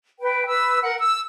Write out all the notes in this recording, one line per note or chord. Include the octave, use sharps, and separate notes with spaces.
B4 G5
B4 E6
A#4 F#5
E6